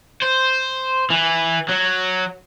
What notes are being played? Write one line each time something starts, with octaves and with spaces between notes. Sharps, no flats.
C5
E3
F#3